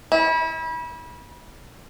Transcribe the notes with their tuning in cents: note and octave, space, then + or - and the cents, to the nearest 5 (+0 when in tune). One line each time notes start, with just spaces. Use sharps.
E4 -30